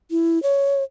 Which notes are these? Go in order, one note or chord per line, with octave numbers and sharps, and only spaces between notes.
E4
C#5